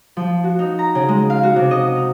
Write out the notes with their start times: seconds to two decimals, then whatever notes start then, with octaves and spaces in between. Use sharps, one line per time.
0.17 F3
0.44 F#4
0.59 D#4
0.79 A#5
0.95 C#3
1.08 G#3
1.30 F5
1.43 F#4
1.56 C3
1.71 D#5
1.96 D#4